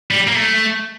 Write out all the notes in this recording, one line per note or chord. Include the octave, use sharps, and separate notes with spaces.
G3
A#3
A3